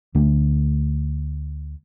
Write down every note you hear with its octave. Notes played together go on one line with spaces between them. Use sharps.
D2 D3 A3